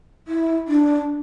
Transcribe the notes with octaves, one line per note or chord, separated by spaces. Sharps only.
E4
D4